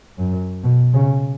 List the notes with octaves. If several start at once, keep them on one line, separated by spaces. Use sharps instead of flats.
F#2
B2
C#3